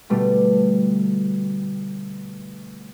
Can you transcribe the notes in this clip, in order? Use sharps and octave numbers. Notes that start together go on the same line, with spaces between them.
B2 D3 G3 A3